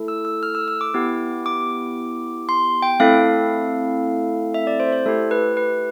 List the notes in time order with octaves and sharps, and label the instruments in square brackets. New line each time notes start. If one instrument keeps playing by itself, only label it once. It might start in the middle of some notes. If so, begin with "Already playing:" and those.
Already playing: [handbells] A3 E4 A4
E6
E6
F6
E6
E6
D6
B3 E4 G4
D6
C6
G5
A3 C4 E4 A4 F5
E5
D5
C5
C5
A3 E4 G4 A4
B4
B4